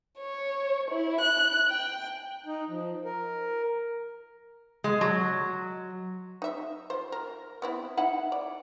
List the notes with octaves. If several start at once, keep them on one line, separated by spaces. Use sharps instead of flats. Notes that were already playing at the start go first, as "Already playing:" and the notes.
C#5
E4
F#6
G5
D#4
F3
A#4
G#3
F#3
D#4 E5
F3 C5
A#4
B3 C4 E4
D#4 E4 F#5
D5